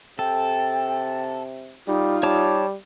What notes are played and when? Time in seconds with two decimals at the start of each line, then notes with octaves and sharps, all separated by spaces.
0.19 C3 A4 G5
1.88 G3 D#4 F4
2.23 G3 C#5 A5 D6